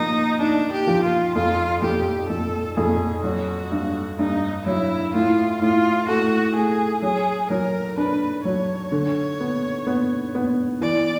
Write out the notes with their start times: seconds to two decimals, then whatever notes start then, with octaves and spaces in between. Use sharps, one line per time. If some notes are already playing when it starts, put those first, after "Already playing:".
Already playing: F3 A#3 D#4
0.40 D4 D#4
0.72 G4
0.87 F3
1.03 F4
1.35 F2 F4
1.82 F2 G4
2.29 F2 A4
2.77 F2 G#4
3.24 F#3 F#4
3.72 G2
4.19 G2 D#4
4.66 F#3 E4
5.14 A2 F4
5.61 A2 F4
6.08 A3 F#4
6.56 A3 G#4
7.02 F#3 G#4
7.50 F#3 A#4
7.97 D4 B4
8.45 F#3 C#5
8.92 D3
9.40 B3
9.87 B3
10.35 B3
10.81 E3 D5